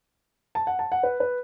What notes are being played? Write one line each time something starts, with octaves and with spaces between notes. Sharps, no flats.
A5
F#5
A5
F#5
B4
B4